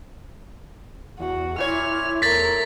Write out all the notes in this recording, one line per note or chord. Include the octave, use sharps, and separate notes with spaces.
E2 F#4
A#2 E4 C#5 F6
E2 A3 A#4 A6 B6